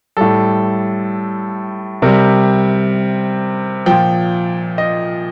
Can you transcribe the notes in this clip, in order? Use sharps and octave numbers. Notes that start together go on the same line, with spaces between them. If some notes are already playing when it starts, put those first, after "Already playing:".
A2 G3 A4
C3 G3 A#4
A#2 F3 G5
D#5